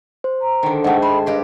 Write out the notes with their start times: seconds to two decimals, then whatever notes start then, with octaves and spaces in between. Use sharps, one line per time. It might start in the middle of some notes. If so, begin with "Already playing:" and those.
0.24 C5
0.42 A#5
0.63 D3 D#3
0.84 G#2 A3 D#5 F#5 G5 A5
1.02 C5 G#5 B5
1.26 G2 G4 D#5 C6